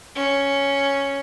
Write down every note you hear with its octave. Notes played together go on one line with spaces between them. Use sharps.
C#4